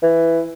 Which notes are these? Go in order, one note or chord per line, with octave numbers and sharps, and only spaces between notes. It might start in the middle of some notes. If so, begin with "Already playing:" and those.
E3